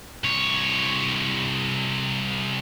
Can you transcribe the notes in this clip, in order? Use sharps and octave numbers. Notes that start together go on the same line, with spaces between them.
C2 C#5